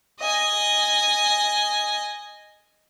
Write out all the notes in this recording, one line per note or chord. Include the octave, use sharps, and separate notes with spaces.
D#5 G#5